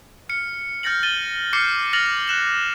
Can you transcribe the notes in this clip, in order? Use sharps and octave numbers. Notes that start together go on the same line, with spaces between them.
F6 C#7
F6 G6 A6 A#6 C#7 F#7
A6 D#7 G7
D6 F6 G6 C7 C#7
F6 A6 A#6 F7 F#7
F#6 E7 F#7